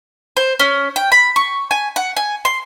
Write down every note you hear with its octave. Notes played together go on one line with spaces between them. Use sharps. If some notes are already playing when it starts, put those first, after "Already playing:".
C5
C#4
G5
B5
C#6
G#5
F#5
G#5
C6